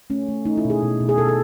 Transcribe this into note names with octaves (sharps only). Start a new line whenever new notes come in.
A3 C#4
A3
A3 D#4
E4
B2
G#4
B2
B2
G#4
B2 A4
A4